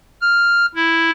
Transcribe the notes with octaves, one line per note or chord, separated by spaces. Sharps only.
F6
E4